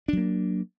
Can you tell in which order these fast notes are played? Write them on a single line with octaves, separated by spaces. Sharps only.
D4 F#3 A#3